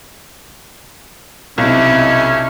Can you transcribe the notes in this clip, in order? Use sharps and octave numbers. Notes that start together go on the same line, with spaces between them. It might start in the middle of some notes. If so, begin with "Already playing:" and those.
B1 C3 C#4 E4